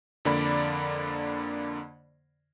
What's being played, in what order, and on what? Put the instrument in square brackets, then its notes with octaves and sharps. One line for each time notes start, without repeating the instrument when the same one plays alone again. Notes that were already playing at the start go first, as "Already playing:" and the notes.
[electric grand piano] F2 D3 A#3 D5 B5